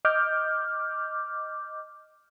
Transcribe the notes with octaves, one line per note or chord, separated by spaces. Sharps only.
D#5 D6 F6 G6